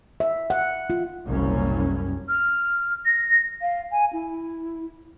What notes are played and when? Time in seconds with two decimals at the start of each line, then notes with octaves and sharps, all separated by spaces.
0.20 E5
0.50 F#5
0.90 F4
1.26 F#1 C2 F#2 A#2 C#4
2.28 F6
3.05 A#6
3.61 F5
3.92 G#5
4.13 E4